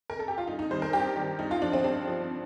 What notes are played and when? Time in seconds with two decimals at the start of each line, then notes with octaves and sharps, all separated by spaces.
0.10 A#4
0.19 A4
0.28 G4
0.38 F4
0.47 G2 D#4
0.59 D#4
0.70 D#3 G3 C5
0.82 A#4
0.93 G2 G4
1.16 D#3 G3
1.39 G2 D#4
1.51 F4
1.62 F3 D4
1.73 C4
1.84 G2 D4
2.08 F3